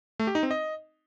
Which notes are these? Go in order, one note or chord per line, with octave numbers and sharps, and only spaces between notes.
A3
G4
D#4
C4
D#5